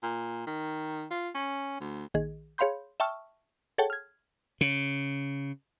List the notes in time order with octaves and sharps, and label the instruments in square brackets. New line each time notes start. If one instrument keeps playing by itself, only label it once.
[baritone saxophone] A#2
D#3
F4
C#4
D2
[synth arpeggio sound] A#1 D#3 G#4
G#4 C#5 F5 B5 C6 G6
E5 G5 A5 C#6 E6 F6
G#4 A4 C#5 F#5 G5 A5
F6 G#6
[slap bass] C#3